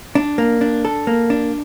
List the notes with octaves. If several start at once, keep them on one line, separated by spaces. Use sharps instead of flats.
D4
A#3
D4
A4
A#3
D4